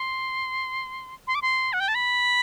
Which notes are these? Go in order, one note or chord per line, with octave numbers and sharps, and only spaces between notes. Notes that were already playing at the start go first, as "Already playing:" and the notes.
Already playing: C6
C6
D6
C6
F#5
G5
A5
B5